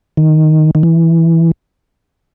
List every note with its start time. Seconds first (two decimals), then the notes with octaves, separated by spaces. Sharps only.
0.17 D#3
0.75 D#3
0.83 E3